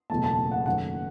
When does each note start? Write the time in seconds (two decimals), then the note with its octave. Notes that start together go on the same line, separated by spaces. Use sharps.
0.10 F#1 E2 B2 A3 A5
0.24 A5
0.52 F#5
0.66 F#1 F#2 D#3 A3 C#4 F#5